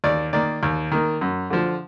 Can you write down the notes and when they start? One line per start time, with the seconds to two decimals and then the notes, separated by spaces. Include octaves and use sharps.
0.04 D#2 D5
0.33 D#3 A#3 D5
0.63 D#2
0.91 D#3 A#3
1.21 F#2
1.50 D3 F3